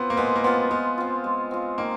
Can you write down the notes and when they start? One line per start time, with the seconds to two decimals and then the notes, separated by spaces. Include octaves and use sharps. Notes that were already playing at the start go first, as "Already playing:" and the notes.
Already playing: B3 C4 F4
0.10 A#3
0.17 G#3 B3
0.35 A#3
0.44 B3 C4 F4
0.71 G#3 B3
0.98 C4 F4
1.24 G#3
1.51 C4 F4
1.78 D#3 A#3